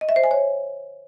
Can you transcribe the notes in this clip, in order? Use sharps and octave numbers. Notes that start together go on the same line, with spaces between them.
D#5
E5
C5
G#5
C#5